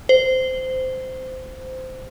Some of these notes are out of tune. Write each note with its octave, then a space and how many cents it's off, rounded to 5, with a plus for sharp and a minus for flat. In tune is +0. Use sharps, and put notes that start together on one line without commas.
C5 -15